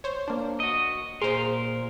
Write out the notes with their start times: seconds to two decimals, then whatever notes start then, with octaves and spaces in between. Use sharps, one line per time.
0.04 C5 C#5
0.28 A#3 D4
0.60 F#4 D#5
1.22 A#2 G#4 A#4 C5 C6